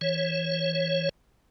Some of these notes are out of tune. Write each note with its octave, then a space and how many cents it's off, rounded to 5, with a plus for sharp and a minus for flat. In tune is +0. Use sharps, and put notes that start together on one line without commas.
E3 +0 C#5 -15